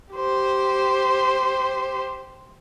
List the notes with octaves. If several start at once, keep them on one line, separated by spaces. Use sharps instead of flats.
G4 C5